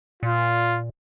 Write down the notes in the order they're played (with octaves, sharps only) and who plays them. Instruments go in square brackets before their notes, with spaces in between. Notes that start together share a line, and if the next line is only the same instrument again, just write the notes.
[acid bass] A#2 [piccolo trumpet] F4